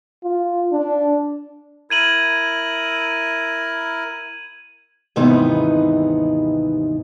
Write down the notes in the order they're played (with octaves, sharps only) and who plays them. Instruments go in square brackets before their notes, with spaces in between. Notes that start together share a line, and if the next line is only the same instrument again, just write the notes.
[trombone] F4
D4
[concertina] E4 A#4 [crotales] G#6 D#7 F#7
[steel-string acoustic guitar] D#2 G#2 C3 E3 B3 D#4